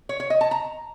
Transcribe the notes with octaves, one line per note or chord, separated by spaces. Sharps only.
C#5
C#5
D#5
A5
A#5